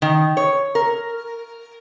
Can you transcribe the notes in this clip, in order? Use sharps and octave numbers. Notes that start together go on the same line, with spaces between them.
D#3
C#5
A#4